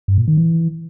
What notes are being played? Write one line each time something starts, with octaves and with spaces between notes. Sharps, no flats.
G2
A#2
D#3
E3